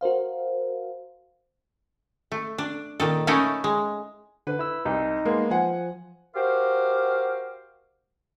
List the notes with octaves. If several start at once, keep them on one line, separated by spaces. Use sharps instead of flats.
F#4 A#4 C5 F5
A3
D4
A#2 D#3 A4
A3 C#4 D#4 E4 A4 A#4
G#3
D3 B4
E4 E6
C2 D#4
G#3 A#3 B3
F3 F#5 G#5
F#4 G4 A#4 C5 F5 D6